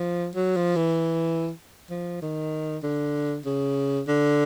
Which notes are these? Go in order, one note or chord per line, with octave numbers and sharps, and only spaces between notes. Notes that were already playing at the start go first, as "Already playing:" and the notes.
Already playing: F3
F#3
F3
E3
F3
D#3
D3
C#3
D3